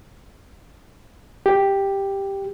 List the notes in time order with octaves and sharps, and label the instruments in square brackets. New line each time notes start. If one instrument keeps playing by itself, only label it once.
[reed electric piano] G4